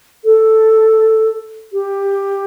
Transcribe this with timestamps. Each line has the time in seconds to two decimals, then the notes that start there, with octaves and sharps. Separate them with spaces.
0.24 A4
1.72 G4